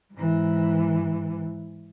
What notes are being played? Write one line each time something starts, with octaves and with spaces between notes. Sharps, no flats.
G#2 E3